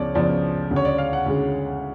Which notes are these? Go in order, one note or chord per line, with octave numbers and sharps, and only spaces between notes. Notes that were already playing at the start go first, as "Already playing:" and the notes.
Already playing: C#2 C#3 F3 B3 C#5 D5
C#2 C#3 F3 B3 D4 D5
D2 C#3 G#3
C#5
D5
F5
F#5
D2 C#3 G#3